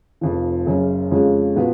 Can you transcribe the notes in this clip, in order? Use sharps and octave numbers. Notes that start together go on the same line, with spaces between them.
F1 F2 F3
F#1 F#2 C#3
F2 C#3 G#3 C#4 F4
A#2 F3 B3 F#4 B4